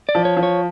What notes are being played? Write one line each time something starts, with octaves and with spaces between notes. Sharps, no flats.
D5
F3
C#5
F3
C#5